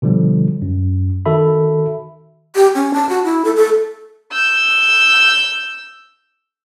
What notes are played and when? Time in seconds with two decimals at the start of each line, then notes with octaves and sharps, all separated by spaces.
0.02 B2 D3 F3 G3
0.62 F#2
1.26 D#3 F#4 A4 E5 B5
2.55 G4
2.75 C#4
2.94 A5
3.09 F#4
3.24 E4
3.45 A4
3.56 A4
4.32 E6 G6